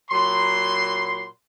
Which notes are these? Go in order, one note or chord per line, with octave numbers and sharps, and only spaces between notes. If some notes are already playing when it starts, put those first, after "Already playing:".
A#2 F#3 B5 C6